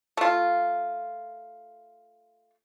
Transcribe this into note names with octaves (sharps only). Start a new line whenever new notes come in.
A3 F4